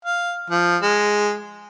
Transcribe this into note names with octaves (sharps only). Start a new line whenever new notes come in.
F5
F3
G#3